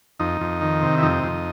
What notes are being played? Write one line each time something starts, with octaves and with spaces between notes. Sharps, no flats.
F2 D#4
F2
D#3
C3
E4
F2 D#4
F2